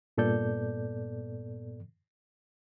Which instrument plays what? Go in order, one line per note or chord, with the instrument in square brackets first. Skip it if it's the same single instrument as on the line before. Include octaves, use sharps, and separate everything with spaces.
[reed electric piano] G2 A#2 B3 A4 D5 G6